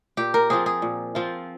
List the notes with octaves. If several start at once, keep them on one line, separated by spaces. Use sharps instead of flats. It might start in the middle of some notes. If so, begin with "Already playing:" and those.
A#2 G4
A#4
F3 C4 F4 G#4
G#4
A#2
F3 C4 F4